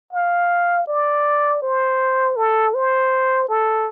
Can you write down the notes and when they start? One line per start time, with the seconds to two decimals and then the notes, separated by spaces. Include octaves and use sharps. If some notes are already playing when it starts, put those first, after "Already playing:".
0.13 F5
0.87 D5
1.62 C5
2.37 A4
2.74 C5
3.49 A4